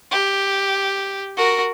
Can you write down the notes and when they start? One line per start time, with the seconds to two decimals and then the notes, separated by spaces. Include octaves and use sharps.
0.11 G4
1.37 F#4 A#4